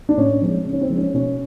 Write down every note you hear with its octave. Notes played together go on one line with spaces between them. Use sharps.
D4
A2 C#4
F3 G#3 C4
C#3
C#4
C4
F3 G#3
C#4
B2 C#4